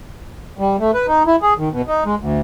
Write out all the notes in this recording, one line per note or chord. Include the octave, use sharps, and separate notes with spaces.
G3
A3
B4
D#4
E4
G#4
D#3
B2
D#4
G#3
D2